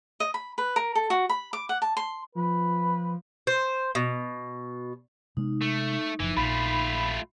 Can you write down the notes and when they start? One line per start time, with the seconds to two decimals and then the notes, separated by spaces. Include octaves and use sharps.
0.20 D#5
0.34 B5
0.58 B4
0.76 A#4
0.95 A4
1.10 F#4
1.29 B5
1.53 D6
1.69 F#5
1.82 A5
1.97 C6
2.35 F3 B4
3.47 C5
3.95 B2
5.37 C3 G#3 B3 D#4
5.61 A3
6.20 F#1 E3 F3
6.37 A#1 A3 F4 B5